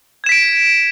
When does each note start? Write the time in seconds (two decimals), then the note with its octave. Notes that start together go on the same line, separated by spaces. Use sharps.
0.24 G#6
0.26 E7
0.29 B6
0.32 D7